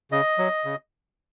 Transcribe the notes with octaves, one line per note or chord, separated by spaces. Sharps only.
C#3 D#5
F#3
C#3